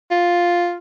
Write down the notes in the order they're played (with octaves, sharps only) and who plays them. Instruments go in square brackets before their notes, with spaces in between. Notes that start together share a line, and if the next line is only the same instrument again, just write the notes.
[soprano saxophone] F4